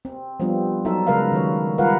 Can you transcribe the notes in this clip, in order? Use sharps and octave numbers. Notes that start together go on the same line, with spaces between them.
C4
F3 G3 B3 C4 D4 F4
F#3 D#4 F#4 A4 E5
C#3 G#3 A#4 B4 E5 F5
D#3 F#3 C#5
G3 F4 A#4 B4 F5 F#5